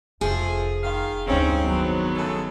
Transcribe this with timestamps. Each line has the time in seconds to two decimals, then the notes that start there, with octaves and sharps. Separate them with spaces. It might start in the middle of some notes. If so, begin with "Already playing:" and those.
0.21 F1 F3 A3 G#4
0.84 D#3 F4 F5
1.27 F1 D2 G2 C4 C#4 D#4
1.61 D#3 F#3 B3
2.15 C#3 G#3 A4